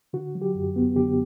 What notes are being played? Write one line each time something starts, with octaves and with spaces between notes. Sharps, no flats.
D3 F#4
F#3
G4
F#2
B3
D3 G4